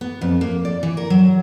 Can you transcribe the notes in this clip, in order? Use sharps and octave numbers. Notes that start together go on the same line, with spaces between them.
B3
F2
A#3
D5
E3
A#4
F#3